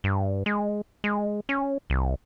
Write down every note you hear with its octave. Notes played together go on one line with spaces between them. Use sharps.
G2
G#3
G#3
C#4
C2